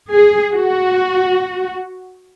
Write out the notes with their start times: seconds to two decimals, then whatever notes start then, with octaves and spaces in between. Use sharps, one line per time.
0.11 G#4
0.52 F#4